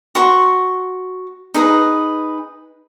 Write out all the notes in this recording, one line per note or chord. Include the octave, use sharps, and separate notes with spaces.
F#4 C6 C#6
D#4 G#4 B4 A#5